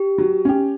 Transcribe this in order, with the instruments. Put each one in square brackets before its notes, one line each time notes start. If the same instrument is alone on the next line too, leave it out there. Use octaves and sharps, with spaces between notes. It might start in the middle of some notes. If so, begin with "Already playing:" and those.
Already playing: [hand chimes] G4
[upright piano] F#3
C#4 G4